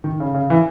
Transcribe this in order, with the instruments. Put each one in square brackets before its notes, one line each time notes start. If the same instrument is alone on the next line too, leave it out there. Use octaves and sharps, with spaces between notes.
[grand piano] D#3
C#3
C#3
E3